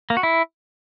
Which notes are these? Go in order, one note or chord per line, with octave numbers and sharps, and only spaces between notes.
A#3
F#4
E4